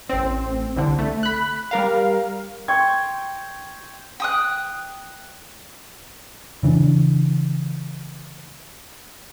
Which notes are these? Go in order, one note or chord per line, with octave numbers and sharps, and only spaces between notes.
A1 C4
C2 D3
A3
B5 F#6
G3 A#4 F5
G5 C6 C#6 G#6
G5 D#6 F#6
C#3 E3 C4 D4